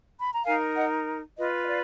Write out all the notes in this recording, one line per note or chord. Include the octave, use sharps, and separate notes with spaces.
B5
A#5
D#4 A#4 F5 G#5
D#5 F#5
F4 B4 D#5
D#5
D5 F5